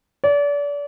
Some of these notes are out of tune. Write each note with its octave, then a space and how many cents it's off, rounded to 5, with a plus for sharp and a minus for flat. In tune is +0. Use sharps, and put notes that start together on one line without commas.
D5 -35